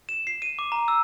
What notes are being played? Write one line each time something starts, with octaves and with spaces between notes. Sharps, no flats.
E7
C7
D#7
D6
A#5
E6